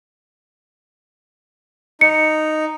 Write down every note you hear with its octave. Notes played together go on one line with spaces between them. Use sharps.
D#4 C#7